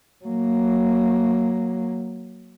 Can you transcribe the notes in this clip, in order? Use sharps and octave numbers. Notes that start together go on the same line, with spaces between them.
F#3 A#3